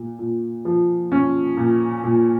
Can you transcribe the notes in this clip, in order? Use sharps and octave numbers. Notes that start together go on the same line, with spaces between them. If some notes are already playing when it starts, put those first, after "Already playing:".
Already playing: A#2
A#2
F3
C#4
A#2
A#2